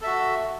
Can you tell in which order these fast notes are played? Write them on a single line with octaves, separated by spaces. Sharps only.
A4 E5 F#4